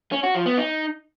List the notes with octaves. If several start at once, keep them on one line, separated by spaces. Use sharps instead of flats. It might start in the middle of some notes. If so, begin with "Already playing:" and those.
C#4
F#4
F3
B3
D#4